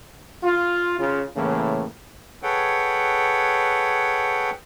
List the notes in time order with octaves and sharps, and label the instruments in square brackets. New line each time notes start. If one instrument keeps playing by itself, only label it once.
[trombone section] F4
C#3 F4
A2 C#3 E3 A#3
[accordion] G#4 A4 B4 C#5 F#5 G5